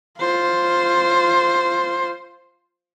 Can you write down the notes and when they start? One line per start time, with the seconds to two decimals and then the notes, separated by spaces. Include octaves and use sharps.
0.19 F4 C5